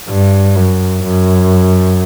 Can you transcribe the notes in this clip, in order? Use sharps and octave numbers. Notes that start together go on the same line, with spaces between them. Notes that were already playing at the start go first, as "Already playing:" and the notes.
G2
F#2
F#2